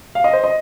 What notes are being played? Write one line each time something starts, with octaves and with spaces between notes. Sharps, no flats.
F5
D#5
C5
D#5